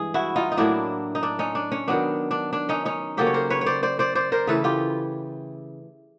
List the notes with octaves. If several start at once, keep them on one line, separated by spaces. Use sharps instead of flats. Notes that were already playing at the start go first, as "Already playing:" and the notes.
Already playing: G2 E3 G#3 G#4
E4 F#4
D#4 F4
D#4
A2 F#3 A#3 D4 E4
D#4
D4
C#4 D#4
D4
C#4
D#3 F#3 B3 D4
D4
D4
C#4 D#4
C#4 D#4
C#3 F#3 A#3 C#4 G4 A4
C#5
A#4 C5
B4 C#5
C#5
C5 D5
C5 D5
C5 D5
C5 D5
A#4 C5
C#3 E3 A3 A4 B4
F4 G4